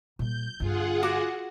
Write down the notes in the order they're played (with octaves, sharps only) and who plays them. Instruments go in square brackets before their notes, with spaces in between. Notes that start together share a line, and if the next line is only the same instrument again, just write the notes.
[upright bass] A#2 G3 [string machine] G6
[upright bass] G2 D3 [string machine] F4 G#4 F#5
[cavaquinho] F#4 D6